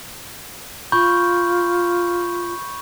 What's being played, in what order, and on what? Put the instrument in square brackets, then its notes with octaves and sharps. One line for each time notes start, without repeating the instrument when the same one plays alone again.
[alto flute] F4 [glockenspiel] B5 C#6 G6